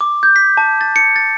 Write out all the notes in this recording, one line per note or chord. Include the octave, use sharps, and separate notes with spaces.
D6
G6
B6
A5
A6
C#7
A6